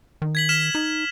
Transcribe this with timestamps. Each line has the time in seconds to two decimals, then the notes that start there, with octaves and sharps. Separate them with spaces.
0.22 D#3
0.35 G#6 B6 F#7
0.49 F6 B6 E7
0.75 D#4